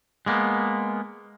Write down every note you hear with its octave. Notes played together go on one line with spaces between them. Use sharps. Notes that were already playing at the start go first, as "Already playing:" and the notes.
G#3 A#3 B3